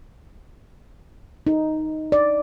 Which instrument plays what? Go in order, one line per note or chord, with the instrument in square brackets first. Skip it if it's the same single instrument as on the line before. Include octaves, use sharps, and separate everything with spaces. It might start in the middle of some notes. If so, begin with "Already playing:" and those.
[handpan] D#4
D5